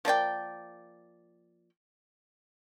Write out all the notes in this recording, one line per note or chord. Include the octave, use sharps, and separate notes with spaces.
F3 A#3 D5 G5